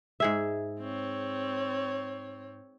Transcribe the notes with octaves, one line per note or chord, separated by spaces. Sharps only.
G#2 G#4 E5
C4 C#5